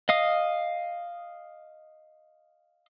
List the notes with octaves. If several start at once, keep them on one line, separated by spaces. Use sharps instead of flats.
D#5 F5 D#6